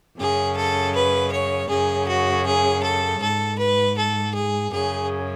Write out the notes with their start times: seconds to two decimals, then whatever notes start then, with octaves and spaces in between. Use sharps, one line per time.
0.17 F#2 C#3 G#4
0.55 A4
0.93 B4
1.31 C#5
1.68 F#2 C#3 G#4
2.07 F#4
2.45 G#4
2.82 A4
3.20 G#2 A4
3.58 B4
3.97 A4
4.34 G#4
4.71 F#2 C#3 G#4